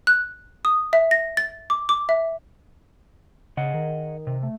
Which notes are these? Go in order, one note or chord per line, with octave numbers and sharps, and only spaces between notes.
F#6
D#6
E5
A#6
A6
D6
D6
E5
C#3 G#4 D#5 F#5
D#3
C3
A3